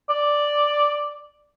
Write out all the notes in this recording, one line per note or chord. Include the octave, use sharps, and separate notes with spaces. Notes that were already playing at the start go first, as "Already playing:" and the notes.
D5